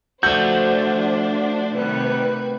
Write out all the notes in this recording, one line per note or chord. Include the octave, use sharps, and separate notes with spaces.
F3 A3 D4 F#4 C5 G6
C3 D#3 G3 B4